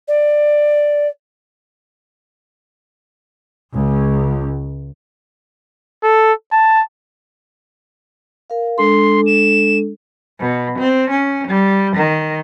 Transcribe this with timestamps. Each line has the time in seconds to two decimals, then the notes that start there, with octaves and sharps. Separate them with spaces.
0.08 D5
3.73 C#2
6.03 A4
6.52 A5
8.50 A#4 F5
8.78 G#3 D4 A4 C6
9.26 E7
10.40 B2
10.79 C4
11.10 C#4
11.48 G3
11.96 D#3